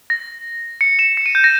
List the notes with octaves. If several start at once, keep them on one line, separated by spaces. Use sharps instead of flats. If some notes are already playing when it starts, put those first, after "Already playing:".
A#6
C#7
E7
C#7
D#7
G6
A#6